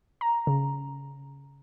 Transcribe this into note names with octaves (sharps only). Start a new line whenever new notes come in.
A#5
C#3